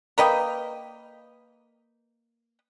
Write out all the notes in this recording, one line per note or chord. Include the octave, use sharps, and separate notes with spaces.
A#3 B4 D#5 G5